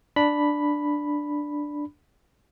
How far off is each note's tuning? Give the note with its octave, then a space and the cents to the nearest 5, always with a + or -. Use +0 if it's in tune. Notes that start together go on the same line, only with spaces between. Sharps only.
D4 +0 B5 +0